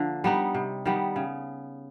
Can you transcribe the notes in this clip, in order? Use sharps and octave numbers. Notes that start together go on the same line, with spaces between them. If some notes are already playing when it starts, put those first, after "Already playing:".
Already playing: D3 F3 A#3
G3 B3 D#4
C3
D#3 G3 B3
C#3